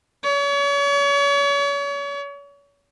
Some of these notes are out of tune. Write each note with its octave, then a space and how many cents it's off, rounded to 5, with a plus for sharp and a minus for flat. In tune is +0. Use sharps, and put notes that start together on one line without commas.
C#5 +35